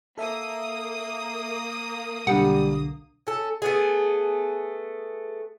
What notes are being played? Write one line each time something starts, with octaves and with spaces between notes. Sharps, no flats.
A#3 A4 E5 D#6
B1 D3 G3 F#5
C#4 A4
A3 B3 G#4